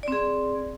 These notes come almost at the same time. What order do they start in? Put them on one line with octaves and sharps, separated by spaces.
D5 C4 G#4